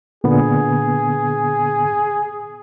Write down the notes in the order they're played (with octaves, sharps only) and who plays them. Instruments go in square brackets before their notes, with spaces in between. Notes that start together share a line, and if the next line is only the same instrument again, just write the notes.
[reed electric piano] A#2 D3 B3 [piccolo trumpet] G#4